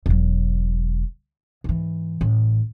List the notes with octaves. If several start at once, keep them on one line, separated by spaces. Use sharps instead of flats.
E1 F#3
G#2 E3
A1